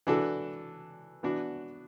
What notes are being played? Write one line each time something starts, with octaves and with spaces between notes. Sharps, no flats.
E3 D4 F#4 A4
E3 B3 D4 F#4